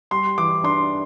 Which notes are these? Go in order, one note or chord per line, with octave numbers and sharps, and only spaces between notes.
G3 C6
E3 D6
D4 C6